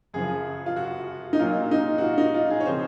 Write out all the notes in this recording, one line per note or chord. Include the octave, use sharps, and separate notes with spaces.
F#2 C#3 F3 G#4
F4
F#4
D#4
A#2 F#3 A#3 F4
D#4
F#4
F4
D#4
F4
G#4
C#5
C#3 F3 C4 C5